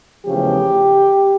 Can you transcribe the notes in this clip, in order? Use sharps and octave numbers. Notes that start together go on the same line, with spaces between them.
E2 C#3 F3 A3 G4